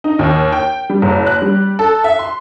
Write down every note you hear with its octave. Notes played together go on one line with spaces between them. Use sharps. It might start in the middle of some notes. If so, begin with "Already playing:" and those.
D#4
D#2
G5
G3
F#1
F#6
G3
A4
E5
C6